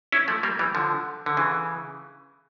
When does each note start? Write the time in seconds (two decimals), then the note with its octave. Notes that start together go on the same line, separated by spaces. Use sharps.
0.12 C#4 E4
0.28 F3 A3
0.43 G3 A#3
0.59 E3 G3
0.75 D3 F3
1.26 D3
1.37 C#3 E3